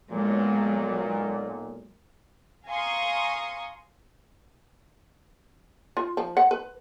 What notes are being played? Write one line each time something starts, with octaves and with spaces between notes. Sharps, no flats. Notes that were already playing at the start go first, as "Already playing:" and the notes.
B1 A#2 F#3 G#3
F5 G#5 A#5 C6 C#6 D#6
F4
F3
F#5
B4